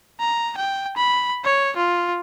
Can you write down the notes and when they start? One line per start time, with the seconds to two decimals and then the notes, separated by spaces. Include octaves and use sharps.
0.20 A#5
0.57 G5
0.96 B5
1.44 C#5
1.76 F4